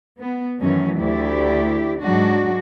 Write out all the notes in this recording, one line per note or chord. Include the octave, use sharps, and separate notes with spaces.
B3
F#2 D#3 E3 F#3 A3 C#4
D2 E4 G4 D5
G#2 F#3 G#3 D4 F#4